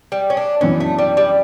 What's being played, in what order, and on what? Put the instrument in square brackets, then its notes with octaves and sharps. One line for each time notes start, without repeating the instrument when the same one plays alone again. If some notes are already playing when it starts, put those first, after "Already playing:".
[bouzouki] G3
C#4
D4
[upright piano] F#2 E3 B3 D4 [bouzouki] C#4
[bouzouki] A3
G3
G3